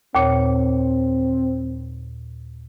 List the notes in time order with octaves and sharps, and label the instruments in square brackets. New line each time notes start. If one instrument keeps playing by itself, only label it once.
[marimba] D#2 A#2 C#5 [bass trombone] C4